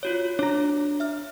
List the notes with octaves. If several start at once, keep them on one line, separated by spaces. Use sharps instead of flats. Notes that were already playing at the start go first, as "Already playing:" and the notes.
F4 F#4 C#5
D4 C#5 A#5
E5 F6